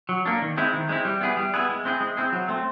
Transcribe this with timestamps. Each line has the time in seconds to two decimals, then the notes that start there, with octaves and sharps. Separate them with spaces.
0.09 F#3
0.26 A#3 D4
0.42 D#3
0.57 G#3 C4 E4
0.73 D#3
0.89 G#3 C4 E4
1.05 G3
1.21 B3 E4 G#4 B4
1.37 G3
1.54 B3 E4 G#4 B4
1.69 G#3
1.85 C4 E4 G#4
2.00 G#3
2.17 C4 E4 G#4
2.33 F#3
2.48 A3 C4